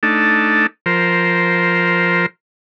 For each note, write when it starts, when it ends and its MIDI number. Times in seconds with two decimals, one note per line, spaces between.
0.03 0.67 57
0.03 0.67 62
0.03 0.67 63
0.03 0.67 69
0.86 2.26 53
0.86 2.26 70
0.86 2.26 72